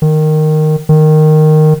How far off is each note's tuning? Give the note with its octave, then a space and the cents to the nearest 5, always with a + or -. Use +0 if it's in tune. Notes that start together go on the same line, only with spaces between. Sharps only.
D#3 -10
D#3 -10